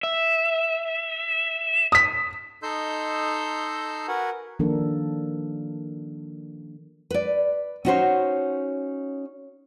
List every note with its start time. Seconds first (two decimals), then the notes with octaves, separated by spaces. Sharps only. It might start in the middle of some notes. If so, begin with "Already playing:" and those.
0.03 E5
1.92 D#6 B6
2.63 D#4 A4 D#5 C6 E6 G6
4.08 F#4 A#4 B4 F#5 G#5
4.59 D#3 F3 A#3 D4 A4 A#4
7.10 B4 D5
7.85 C#4 D#4 F#4 A#4 C5 C#5